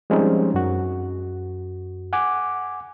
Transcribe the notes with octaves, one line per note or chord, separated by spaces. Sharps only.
F3 G3 G#3 C4 C#4 D#4
F#2 F#4
F#5 G#5 D6